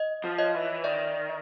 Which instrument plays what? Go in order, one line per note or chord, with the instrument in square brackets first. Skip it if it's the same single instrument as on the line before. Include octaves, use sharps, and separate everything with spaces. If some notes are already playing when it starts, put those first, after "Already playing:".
Already playing: [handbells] D#5
[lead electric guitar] F3
[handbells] C#5 D#5
[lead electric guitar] E3
[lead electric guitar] D#3 [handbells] D5 E5